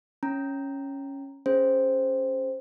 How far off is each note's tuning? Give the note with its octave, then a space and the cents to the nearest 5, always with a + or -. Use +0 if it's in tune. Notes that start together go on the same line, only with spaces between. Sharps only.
C#4 -5 A#5 -5
C#4 +0 G#4 +0 C5 +0